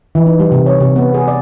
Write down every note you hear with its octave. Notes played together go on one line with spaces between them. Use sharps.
E3
D#4
G3
C3
C#5
C3
B3
G#4
D5